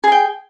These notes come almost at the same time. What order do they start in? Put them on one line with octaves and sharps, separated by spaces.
G#4 G#5 G5